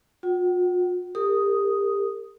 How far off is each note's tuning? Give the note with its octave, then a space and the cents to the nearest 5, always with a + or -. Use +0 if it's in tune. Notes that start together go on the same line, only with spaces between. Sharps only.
F4 +45 F#5 +45
G4 +30 A#4 -35 D#6 +0